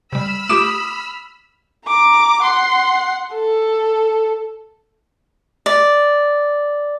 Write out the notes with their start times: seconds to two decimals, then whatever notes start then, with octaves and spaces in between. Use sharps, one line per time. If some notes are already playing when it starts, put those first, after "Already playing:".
0.13 C3 G3 B5 E6 F6
0.49 A3 F4 G4 D6 D#6 E7
1.86 A#5 D6
2.42 F#5 C6
3.34 A4
5.66 D5